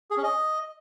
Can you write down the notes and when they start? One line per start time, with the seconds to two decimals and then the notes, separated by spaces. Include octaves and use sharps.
0.11 G#4
0.17 C#4
0.23 D#5